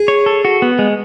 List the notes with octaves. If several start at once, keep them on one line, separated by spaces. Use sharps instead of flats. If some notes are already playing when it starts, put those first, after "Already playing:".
Already playing: G#4
C#5
A4
F#4
B3
G#3